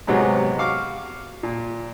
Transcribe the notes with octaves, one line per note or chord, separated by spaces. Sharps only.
G#2 C3 F#3 G#3 B3 D#4
F#4 F5 D6
A#2